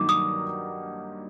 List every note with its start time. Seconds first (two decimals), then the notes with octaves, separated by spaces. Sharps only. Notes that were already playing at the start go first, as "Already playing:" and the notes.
Already playing: G2 D#3 F#3 A#3 D#4 D6
0.09 D#6